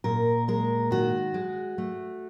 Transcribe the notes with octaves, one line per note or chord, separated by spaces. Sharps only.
A#2 A#4
G#3 A#4
D#3 F#4
G#3
A3